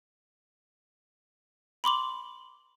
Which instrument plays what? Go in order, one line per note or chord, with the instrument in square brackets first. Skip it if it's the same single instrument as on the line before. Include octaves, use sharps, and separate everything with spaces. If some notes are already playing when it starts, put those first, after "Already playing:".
[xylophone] B5 C6 D6 F#7